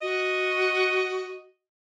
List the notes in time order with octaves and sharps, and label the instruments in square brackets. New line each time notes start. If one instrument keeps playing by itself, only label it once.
[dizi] F#4 [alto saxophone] D#5